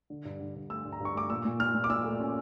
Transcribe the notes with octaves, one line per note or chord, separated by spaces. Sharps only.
D3
G2
D3
G2
A3 E6
G2
A#5
G2
C#6
A3 D6
A#2 E6
A#2
A#2 F6
A#2
D6
A#2 E6
A3
C#4